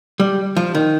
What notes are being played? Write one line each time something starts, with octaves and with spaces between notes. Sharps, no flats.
G3
F3
D#3